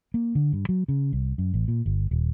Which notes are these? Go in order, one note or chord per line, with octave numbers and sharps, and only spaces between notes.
A#3
D3
G2
F#3
C#3
C2
F#2
A1
A#2
G1
D#1